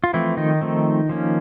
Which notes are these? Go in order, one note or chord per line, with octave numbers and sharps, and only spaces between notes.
F4
E3 F3 A3 C4 E4
D#3 D#4
F3 A3 C4
F3 A#3 C#4